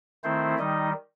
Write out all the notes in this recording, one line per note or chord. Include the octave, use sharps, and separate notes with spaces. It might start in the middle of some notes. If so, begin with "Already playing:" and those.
D#3 A3 C4 E4 C5
D#3 G3 D#4 D#5